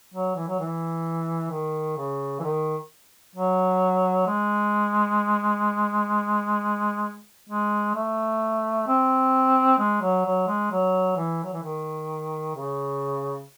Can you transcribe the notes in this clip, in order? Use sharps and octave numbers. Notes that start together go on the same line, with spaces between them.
F#3
E3
F#3
E3
D#3
C#3
E3
D#3
F#3
G#3
G#3
A3
C4
G#3
F#3
F#3
G#3
F#3
E3
F#3
E3
D#3
C#3